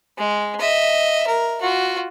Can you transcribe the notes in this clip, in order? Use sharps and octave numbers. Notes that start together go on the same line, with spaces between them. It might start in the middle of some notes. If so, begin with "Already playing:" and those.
G#3
D#5 E5
A#4
F4 F#4